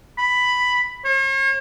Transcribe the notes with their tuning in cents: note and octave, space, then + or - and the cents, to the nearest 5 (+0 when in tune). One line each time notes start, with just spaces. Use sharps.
B5 +5
C#5 -45